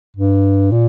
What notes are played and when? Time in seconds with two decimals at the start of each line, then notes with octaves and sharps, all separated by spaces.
0.16 G2
0.72 A#2